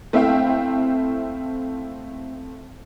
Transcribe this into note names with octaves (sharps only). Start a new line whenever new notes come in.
A3 C4 E4 E5 F5 G5